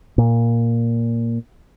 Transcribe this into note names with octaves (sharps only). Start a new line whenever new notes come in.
A#2